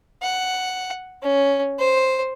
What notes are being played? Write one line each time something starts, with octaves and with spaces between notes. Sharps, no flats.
F#5
C#4
C5